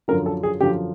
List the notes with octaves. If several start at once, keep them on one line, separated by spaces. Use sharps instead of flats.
F#2 D3 F3 A#4
A4
G#4
F#2 D3 F3 G4